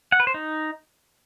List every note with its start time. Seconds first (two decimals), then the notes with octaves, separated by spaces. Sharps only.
0.12 F#5
0.20 B4
0.27 C5
0.34 D#4